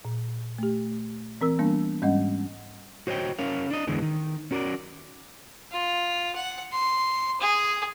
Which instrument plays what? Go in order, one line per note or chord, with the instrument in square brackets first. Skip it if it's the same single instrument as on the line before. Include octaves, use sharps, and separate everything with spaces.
[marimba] A#2
A3 G4
E3 C4 A#4 E6
G3 A#3 B3 D4
G#2 G3 G#3 C#4 D#5 F#5
[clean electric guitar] F#4 C5 C#5 D#5 G5
C#4 A#4 C#5 F5
D4 D#5
E2 D3 E3 G#3 D4
D#3
C#4 F#4 A#4 C5 D5
[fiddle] F4
F#5
C6
G#4